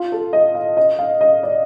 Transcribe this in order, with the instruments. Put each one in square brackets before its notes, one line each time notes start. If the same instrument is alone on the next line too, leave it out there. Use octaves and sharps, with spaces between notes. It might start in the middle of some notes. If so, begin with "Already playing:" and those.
Already playing: [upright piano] F4
A4
D#5
F5
D#5
F5
D#5
D5